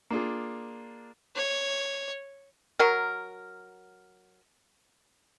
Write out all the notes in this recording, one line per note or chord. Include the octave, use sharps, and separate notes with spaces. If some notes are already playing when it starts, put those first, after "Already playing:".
A#3 D4 F4 G#4
C#5
F#3 A#4